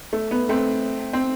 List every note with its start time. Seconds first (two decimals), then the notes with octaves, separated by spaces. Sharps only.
0.13 A3
0.31 B3
0.49 A3 C4
1.13 C4